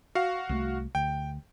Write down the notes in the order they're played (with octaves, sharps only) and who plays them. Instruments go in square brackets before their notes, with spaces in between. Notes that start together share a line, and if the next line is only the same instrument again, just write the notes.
[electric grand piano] F#4 F5
[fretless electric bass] C2 G#3 A3
[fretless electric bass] D2 [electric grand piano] G5